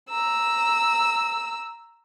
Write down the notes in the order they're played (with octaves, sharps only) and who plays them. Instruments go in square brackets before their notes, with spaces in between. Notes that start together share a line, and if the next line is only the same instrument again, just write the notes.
[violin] A#5 E6